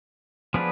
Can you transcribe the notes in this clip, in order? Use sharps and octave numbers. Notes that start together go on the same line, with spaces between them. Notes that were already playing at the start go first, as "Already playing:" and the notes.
F3 B3 D4 G#4 B4